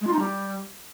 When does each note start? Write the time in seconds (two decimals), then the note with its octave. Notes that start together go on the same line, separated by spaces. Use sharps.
0.01 G#3
0.07 F4
0.13 D#4
0.19 G3